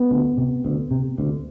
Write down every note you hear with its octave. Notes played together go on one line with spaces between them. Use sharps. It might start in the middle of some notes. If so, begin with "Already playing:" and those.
Already playing: B3
D2
C3
D2
C3
D2